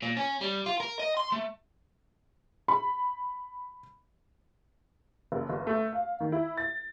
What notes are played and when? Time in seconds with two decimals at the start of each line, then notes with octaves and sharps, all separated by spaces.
0.02 A#2
0.17 C#4
0.41 G3
0.66 F4
0.80 A#4
0.99 D#5
1.17 C6
1.32 A3
2.68 B5
5.32 F#1
5.50 G1
5.67 A3
5.93 F5
6.20 D#3
6.32 E4
6.57 A6